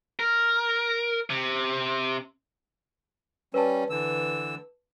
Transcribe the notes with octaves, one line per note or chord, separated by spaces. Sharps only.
A#4
C3
G3 C#4 B4 A5
D3 E3 E6